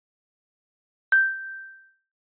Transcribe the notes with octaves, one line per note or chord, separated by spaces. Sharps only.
G6